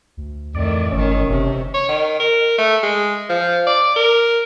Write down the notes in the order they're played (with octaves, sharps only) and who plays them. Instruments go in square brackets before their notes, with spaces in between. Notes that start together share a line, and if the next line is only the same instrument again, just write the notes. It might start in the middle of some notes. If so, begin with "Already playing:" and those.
[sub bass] D2
[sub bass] F2 [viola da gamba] A2 D#3 E3 [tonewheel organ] D5
[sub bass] G1 [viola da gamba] A2 D#3 [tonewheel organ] C#4
[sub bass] F#1 [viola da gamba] C3
[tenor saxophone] C#5
D#3
A#4
A3
G#3
F3
D5
A#4